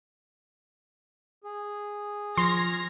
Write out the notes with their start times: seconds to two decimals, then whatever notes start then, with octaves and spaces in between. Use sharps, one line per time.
1.44 G#4
2.38 F3 C6 F6 G#6 A#6